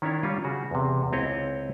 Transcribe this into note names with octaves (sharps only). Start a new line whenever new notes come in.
D#3 C#4 D4 E4 C#5
G3 C#4 F4
C#3 F#4
E2 C3
C#2 C4 E4 C#5 D#5